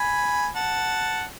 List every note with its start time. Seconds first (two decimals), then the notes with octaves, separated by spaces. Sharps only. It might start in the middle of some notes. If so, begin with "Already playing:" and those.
Already playing: G#5 B5
0.56 F#5 A5